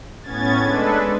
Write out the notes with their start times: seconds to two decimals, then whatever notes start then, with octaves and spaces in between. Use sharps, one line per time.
0.22 A2 B3 C#4 G#6 A6
0.62 G#3 D4 A4 B4